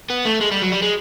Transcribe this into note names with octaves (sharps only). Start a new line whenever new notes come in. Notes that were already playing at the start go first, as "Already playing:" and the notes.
B3
A3
G#3
G3
F#3
G3
G#3